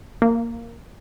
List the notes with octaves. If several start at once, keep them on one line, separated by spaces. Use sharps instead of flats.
A#3